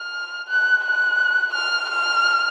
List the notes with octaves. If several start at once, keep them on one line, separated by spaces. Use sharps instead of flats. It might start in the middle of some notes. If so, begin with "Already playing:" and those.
Already playing: F6
F#6
F#6
F6
F6